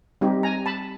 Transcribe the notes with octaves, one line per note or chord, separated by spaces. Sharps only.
G3 C4 D#4 G4
G#5 A#5
A5 B5